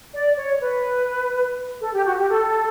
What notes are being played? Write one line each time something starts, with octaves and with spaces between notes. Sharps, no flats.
D5
C#5
B4
A4
G4
F#4
G4
A4